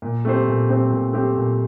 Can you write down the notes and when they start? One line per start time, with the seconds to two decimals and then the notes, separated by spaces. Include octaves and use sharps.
0.02 A#2
0.25 A3 C4 G4 C5
0.47 A#2
0.69 A3 C4 G4 C5
0.90 A#2
1.13 A3 C4 G4 C5
1.35 A#2